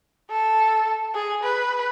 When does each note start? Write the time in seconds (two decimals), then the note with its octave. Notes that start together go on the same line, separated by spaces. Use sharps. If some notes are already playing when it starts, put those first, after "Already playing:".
0.30 A4
1.15 G#4
1.43 B4